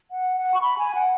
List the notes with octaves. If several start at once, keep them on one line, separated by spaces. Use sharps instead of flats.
F#5
F#5
C#6
B5
G#5
F#5